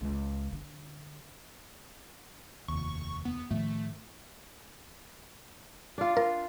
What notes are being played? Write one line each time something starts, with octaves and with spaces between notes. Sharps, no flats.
C#2
D3
F1 D#2 C#6
B3
A2 D#3 F3 A3
D4 F4
F4 A#4